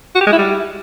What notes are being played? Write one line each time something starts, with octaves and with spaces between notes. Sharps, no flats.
F#4
G4
G#3
E4
G3